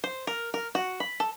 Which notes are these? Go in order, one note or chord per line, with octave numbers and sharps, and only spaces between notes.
C5
A#4
A#4
F#4
B5
A4